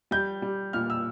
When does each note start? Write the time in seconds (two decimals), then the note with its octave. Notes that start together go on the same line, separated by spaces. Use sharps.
0.11 G3 G6
0.42 G3
0.73 A#2 F6
0.90 E6